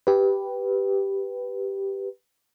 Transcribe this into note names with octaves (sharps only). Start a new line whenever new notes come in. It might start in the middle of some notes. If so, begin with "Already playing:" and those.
G4 B4